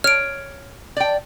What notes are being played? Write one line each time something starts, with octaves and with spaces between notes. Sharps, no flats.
C#5 F6 D7
D5 G5